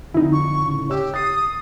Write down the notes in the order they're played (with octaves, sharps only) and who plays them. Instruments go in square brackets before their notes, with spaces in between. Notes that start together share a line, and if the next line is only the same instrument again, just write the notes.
[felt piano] F2 D3 [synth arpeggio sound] D#4 E4
[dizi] C#6
[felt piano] A2 C#3
[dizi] G4 [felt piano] C#5 E6
[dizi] D#6 [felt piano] A6 C7